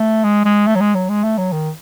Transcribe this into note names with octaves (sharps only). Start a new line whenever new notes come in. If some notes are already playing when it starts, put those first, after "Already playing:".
Already playing: A3
G#3
G#3
A3
F#3
G#3
F#3
G#3
A3
F#3
D#3